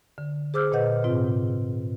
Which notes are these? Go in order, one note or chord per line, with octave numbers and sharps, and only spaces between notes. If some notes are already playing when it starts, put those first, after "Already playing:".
D3
G#4 C5 D6 E6 F6 G6
A#2 B4 D#5 F#5 G6
G#2 C3 C4 F4